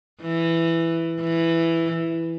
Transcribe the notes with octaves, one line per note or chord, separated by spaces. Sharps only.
E3
E3